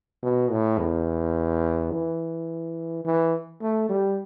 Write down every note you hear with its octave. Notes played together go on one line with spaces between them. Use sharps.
B2
A2
E2
E3
E3
A3
G3